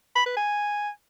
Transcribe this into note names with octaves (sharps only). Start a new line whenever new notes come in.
B5
B4
G#5